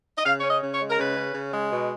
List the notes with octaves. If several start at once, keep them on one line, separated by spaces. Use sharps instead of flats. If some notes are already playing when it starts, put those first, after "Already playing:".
D#5
C#3 F5
C#4 C#5
D#5
C#3
C#5
G#3
A#4
C#3 B4
C#4
C#3
G#3
B2